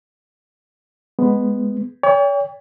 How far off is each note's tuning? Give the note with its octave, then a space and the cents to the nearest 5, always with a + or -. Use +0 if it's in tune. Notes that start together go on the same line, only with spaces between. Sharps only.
G#3 +0 B3 +0
C#5 +40 G5 +35